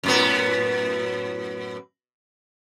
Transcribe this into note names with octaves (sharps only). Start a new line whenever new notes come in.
F#2 A2 B3